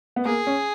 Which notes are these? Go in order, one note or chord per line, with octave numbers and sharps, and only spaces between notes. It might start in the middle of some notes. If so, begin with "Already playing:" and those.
B3
A#3 G#4
C#4